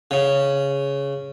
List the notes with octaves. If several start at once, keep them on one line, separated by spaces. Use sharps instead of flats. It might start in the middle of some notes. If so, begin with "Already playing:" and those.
C#3